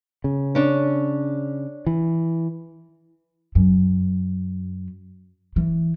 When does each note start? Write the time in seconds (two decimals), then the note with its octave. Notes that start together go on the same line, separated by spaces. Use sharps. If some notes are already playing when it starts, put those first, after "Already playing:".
0.24 C#3
0.55 C#4 D4
1.86 E3
3.55 F#2
5.56 E3